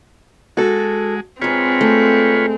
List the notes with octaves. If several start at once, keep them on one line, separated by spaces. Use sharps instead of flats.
G#3 F#4 A4
G#2 C4 F4 G#4 B4 C#5
A3